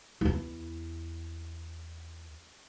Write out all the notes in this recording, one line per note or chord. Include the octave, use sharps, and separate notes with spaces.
E2 E4